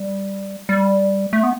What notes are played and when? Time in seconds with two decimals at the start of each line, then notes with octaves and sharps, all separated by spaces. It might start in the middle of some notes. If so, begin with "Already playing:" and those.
Already playing: G3
0.69 G3
1.33 A3
1.43 B3